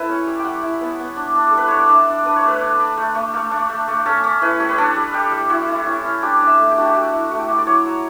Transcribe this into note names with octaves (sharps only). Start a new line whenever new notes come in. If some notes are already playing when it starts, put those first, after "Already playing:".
Already playing: E4 A4 B4
C#4 C#5
G3
G5
G3 F#5
E4
B3
B3
D4
D4
A4
G3 B4
D4 C#5
D5
D4 E5
D4
D4 B4
C#5
A3 B4
D4
D4
A3
A3
A3
D4
A3
A3
C#4 A4
C#4
E4 B4
G3 C#5
B4
D4 A4
G3
G3 G4
G3
E4 F#4
E4
C#4
C#4
D4 G4
D4
E5
A3
G4
D4 F#4
G4
A3 F#4
E4
A3 F#4
G4
E4 F#4
D5
F#3 C#5
F#3